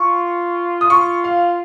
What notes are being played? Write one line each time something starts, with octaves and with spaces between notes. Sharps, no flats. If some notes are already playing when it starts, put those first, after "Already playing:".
Already playing: F4 C#6
D#6
F4 C#6
F5